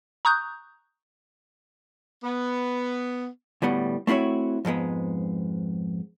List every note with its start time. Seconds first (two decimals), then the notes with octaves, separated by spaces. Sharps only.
0.25 A#5 C#6 D#6 F#6 G6
2.23 B3
3.62 D2 A2 G3 B3
4.07 A3 C4 E4 F#4 C#5
4.65 F2 G#2 G#3 B3